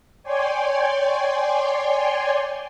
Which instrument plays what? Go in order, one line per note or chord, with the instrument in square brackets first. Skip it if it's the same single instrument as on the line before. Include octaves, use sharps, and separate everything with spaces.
[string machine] C#5 D5 G5 G#5 C6